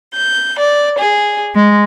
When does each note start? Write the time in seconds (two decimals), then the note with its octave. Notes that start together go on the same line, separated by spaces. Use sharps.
0.14 G6
0.58 D5
0.98 G#4
1.54 G#3